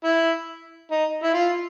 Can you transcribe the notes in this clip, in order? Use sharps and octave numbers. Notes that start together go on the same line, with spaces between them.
E4
D#4
E4
F4